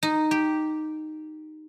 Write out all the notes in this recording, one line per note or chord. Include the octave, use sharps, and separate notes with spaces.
D#4
G4